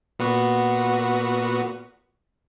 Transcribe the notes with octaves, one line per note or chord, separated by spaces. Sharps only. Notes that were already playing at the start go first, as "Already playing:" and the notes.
A#2 B3 F#4